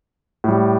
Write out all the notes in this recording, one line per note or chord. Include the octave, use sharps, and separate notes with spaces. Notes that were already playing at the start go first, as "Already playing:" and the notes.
A2 G3